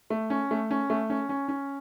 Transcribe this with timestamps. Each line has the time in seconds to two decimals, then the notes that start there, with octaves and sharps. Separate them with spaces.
0.10 A3
0.30 C#4
0.51 A3
0.71 C#4
0.90 A3
1.10 C#4
1.29 C#4
1.48 C#4